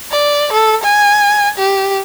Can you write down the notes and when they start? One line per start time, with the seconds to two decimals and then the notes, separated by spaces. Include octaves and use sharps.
0.12 D5
0.52 A4
0.83 G#5
1.58 G4